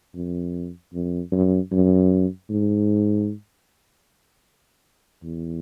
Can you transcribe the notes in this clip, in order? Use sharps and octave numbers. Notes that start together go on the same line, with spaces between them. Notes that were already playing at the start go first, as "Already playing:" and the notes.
F2
F2
F#2
F#2
G#2
E2